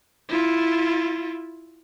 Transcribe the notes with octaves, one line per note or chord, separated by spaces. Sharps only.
E4 F4